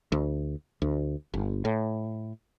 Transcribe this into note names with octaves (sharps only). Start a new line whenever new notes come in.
D2
D2
G1
A2